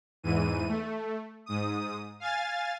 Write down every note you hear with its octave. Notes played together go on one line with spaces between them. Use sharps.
E2 G#2 E3 D#7
A3
G#2 D#6
F5 G#5 A6